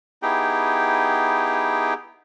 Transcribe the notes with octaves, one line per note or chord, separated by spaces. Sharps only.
B3 D#4 E4 G4 G#4 G5